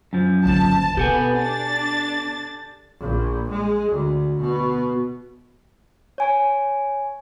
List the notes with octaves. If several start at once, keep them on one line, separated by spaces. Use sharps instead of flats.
F#2 F3
G1 D#2 A5
B2 B3 G4 A4 G#5
D4 A6
A#1
G#3
D2
B2
C#5 G#5